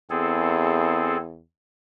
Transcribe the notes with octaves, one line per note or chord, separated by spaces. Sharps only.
E2 C4 G#4 A4